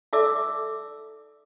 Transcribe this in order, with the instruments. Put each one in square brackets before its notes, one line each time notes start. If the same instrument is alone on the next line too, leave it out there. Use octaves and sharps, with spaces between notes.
[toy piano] D#4 A4 D5 E5 D6 E6